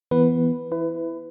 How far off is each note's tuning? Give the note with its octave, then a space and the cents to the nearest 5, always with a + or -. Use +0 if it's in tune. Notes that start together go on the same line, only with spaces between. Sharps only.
E3 +0 B3 +0 B4 +0
E4 +0 B4 +25